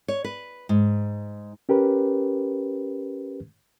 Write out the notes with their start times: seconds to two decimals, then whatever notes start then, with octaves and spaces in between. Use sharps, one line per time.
0.08 C#5
0.24 B4
0.69 G#2
1.69 C#4 G4 A#4 B4